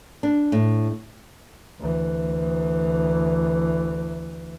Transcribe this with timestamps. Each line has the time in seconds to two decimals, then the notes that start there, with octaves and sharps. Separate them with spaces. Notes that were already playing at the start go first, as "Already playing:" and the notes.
0.23 D4
0.52 A2
1.80 D2 E3